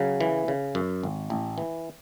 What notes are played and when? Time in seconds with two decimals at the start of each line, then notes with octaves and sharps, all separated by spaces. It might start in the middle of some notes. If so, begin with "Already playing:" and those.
Already playing: C#3 F#3
0.21 E3
0.48 C#3
0.75 F#2
1.03 G#1
1.30 A1
1.58 E3